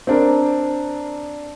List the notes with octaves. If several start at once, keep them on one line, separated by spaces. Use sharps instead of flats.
C4 D4 A#4